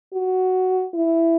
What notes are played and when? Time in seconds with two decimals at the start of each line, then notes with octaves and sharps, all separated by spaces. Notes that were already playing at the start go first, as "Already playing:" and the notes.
0.13 F#4
0.94 E4